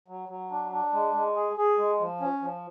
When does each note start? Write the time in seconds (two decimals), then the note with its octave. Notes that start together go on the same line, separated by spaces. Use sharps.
0.08 F#3
0.29 F#3
0.51 D4
0.72 D4
0.93 G#3
1.14 G#3
1.36 G#4
1.57 G#4
1.78 G#3
2.00 F3
2.21 C#4
2.42 F3